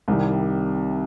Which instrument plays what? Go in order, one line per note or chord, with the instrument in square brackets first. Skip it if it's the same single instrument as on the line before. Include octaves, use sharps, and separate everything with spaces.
[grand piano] C2 C3 D#3 G3